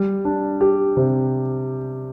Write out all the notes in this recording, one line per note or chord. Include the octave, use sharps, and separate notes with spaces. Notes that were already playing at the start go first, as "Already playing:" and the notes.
Already playing: G3
D4
G4
C3